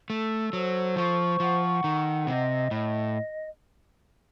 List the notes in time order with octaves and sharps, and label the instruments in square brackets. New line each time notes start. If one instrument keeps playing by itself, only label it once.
[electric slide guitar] A3 [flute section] A4
[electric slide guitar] F#3 [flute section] C5
[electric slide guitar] F3 [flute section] C#6
[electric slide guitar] F3 [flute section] F#5
[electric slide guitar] D#3 [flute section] A4
[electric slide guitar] C3 [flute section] D#5
[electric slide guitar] A2 [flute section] D#5